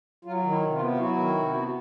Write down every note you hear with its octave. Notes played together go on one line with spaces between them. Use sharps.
F#3 F4
D#3
E4
C3
F4
B3
F4
F#3 E4 F#4
D#3
C3
B3